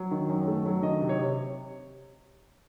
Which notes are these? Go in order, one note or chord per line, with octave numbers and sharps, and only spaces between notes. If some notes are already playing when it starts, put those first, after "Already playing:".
Already playing: F#3
D#3
F#2
A3
F#3
D#3 D#5
C3
C#5
C3